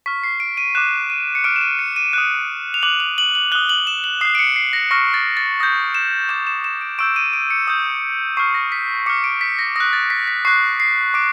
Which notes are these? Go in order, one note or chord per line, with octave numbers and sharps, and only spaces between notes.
C#6 F6 B6
C7
D7
D#7
D6 F#6 E7
D#7
C#7
D6 F6 D7
E7
D#7
C#7
D#7
D#6 F#6
F7
D6 F#6 F#7
F7
F#7
F#7
D#6 F#6 G7
F#7
E7
F#7
D#6 F#6 C7
D7
C#7
C7
A#6
C#6 F6 A#6
A6
A6
D#6 G6 A#6
E7
D6 G6 E7
E7
E7
D7
C#6 E6 G6 D7
D#7
D7
C#7
D#6 G6
C#6 F6 C7
A#6
B6
D6 F6 C#7
D7
B6
A#6
D#6 F#6 A#6
A6
B6
B6
C#6 F#6 C7
C7
D6 D7